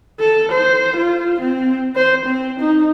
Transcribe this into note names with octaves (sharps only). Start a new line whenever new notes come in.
A4
C5
F4
C4
C5
C4
D#4